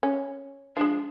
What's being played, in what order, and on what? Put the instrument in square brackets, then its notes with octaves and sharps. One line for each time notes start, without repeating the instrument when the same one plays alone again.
[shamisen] C#4
[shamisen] F3 G#3 [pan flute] D4